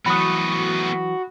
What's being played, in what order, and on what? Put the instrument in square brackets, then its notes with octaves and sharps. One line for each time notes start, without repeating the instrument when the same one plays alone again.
[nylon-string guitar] E3 F#3 [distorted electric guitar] A3 B3 [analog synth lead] F#4 [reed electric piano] B5 D#6